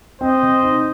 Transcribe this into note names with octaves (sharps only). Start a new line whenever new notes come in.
C4 C5 D#5
C3
D#4